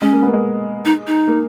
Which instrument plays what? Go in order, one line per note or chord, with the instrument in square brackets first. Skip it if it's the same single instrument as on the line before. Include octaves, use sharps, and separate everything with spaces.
[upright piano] G#3 [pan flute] C#4
[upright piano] A#3
B3
A#3
G#3
[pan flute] D#4
D#4
[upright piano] A#3